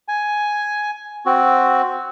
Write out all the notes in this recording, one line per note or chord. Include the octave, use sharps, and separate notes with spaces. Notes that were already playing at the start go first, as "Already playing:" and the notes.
G#5
C4 F#4